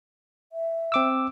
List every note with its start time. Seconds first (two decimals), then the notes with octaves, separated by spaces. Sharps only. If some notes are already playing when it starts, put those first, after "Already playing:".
0.53 E5
0.92 C4 D6 E6